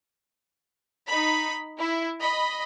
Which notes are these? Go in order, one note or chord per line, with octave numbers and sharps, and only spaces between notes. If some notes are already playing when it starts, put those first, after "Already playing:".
D#4 B5
E4
D#5 B5